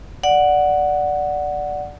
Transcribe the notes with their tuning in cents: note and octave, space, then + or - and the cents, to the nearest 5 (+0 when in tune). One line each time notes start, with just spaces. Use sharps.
D5 +0 F#5 +0